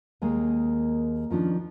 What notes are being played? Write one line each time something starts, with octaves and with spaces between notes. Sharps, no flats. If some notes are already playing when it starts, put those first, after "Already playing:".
D#2 G#3 A#3 G#5
D#3 F3 C#4 D4